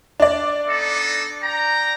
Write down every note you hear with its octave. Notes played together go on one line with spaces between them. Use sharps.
D4 D5
B3 D#4 A4
G5 A#5